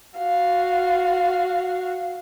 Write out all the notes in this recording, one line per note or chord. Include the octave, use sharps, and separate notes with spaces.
F#4 F5